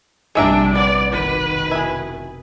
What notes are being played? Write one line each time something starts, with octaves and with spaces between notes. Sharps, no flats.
A#1 C3 G3 G#3 D4 E5 A#5
B3 D5
F1 B2 D#3 B4
E4 G#4